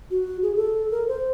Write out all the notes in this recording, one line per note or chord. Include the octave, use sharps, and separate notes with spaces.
F#4
G#4
A4
A#4
C5